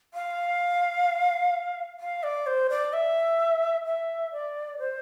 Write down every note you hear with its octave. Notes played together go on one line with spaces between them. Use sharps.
F5
F5
D5
C5
D5
E5
E5
D5
C5